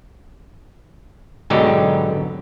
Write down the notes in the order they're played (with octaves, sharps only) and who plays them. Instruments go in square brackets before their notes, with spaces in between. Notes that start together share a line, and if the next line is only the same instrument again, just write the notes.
[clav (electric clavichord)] G#2 B2 D3 F#3 D#4 G4